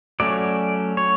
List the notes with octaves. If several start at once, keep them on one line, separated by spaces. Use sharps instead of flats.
F#3 A3 C#4 D5
C#5